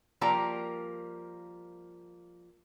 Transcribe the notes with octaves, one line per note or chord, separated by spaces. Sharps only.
F3 G3 A#3 A#4 A#5